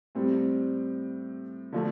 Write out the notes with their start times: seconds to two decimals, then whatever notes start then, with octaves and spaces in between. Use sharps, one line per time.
0.15 A2 G3 C4
1.72 D3 F3 A3